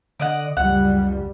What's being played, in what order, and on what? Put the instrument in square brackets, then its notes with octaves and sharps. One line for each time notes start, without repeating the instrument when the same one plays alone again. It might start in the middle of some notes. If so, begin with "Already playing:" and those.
[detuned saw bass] D3 [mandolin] D5 D#5 F#5
[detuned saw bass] C#2 [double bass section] F#2 G3 [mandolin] F#5